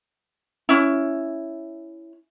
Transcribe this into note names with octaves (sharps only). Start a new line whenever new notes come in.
C#4 E4